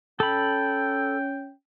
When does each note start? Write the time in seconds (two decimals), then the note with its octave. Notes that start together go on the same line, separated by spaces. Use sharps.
0.20 C#4 A4 G5 B5